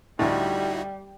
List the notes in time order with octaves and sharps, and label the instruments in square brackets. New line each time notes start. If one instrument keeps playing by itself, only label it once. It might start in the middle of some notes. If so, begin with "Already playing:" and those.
[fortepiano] D2 A2 [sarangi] G3 [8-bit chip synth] D#4 E4 F#4